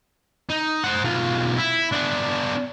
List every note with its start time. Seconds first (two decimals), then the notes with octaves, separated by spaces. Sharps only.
0.49 D#4
0.84 C5 F#5
1.04 B1 F4
1.57 E4
1.92 B3 D4